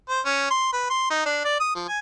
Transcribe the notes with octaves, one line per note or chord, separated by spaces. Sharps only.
C5
C#4
C6
B4
C6
D#4
D4
D5
D#6
F3
G#5